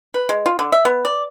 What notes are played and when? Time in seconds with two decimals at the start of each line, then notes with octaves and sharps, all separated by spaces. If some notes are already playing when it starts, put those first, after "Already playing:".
0.14 B4
0.29 G#3
0.46 F4
0.59 D3
0.72 E5
0.85 B3
1.05 D5